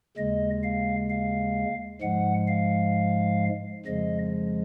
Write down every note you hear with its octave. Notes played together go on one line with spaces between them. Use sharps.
D#2 C#3 G#3 D#5
F5
F5
G#2 F3 G#3 F#5
F5
F2 C#3 F3 G#3 D#5